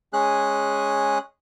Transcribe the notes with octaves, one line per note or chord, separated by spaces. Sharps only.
G#3 C#4 G#4 F#6